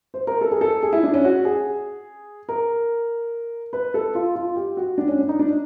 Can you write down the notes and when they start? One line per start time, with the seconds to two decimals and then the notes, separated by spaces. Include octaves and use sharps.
0.14 C5
0.27 A#4
0.41 A4
0.51 G#4
0.61 A4
0.83 G#4
0.93 E4
1.03 D4
1.14 C#4
1.24 F#4
1.45 G#4
2.49 A#4
3.73 B4
3.94 A4
4.15 F4
4.35 F4
4.56 G4
4.77 F#4
4.98 D4
5.08 C#4
5.19 D4
5.29 D#4
5.39 D4